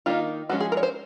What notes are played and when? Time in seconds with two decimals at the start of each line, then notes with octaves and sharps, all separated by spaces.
0.06 D#3 A#3 D#4 F4
0.49 F3 G#3 C#4 F#4
0.60 G#4
0.72 A#4
0.77 C#5
0.83 C5